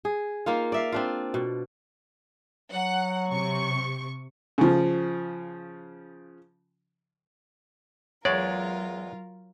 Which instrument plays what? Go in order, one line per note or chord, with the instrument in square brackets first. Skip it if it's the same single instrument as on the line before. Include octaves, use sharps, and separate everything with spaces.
[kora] G#4
A#3 D#4 F4
D5 E5 F5
C4 D4 F4
B2
[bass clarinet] F#3 [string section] F#5
[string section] C3 C#6
[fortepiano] C#3 F3
[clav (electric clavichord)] E2 G#3 D5 [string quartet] F#3 F4 A#4 [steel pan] C#5